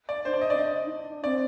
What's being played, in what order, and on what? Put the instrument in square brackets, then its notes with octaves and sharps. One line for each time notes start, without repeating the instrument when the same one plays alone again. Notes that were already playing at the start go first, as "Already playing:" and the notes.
[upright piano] D5
[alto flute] D4 [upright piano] C5
[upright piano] D5
D#5
D5
[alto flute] C4
[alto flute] D4 [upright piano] D#5
[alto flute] D#4
D4
[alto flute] C4 [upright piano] D5